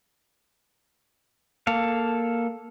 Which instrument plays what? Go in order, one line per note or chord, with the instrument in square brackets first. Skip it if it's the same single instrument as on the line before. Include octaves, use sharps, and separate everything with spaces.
[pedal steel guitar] A#3 A4 F5